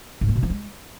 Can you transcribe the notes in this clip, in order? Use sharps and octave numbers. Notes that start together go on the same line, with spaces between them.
G#2
A#3
B2
F3
G#3